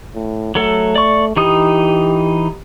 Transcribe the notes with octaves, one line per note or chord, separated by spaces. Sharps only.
A2
F#3 A3 A4
D5 C#6
E3 D#4 G4 D#6